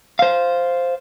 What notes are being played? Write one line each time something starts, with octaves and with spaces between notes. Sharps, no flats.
C5 F5